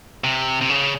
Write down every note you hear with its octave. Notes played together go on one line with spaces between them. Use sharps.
C3
C3
C#3